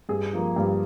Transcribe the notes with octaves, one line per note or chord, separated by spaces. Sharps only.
G2 G#4
F3 A#3
G2